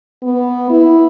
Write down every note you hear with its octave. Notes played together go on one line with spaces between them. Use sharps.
B3
E4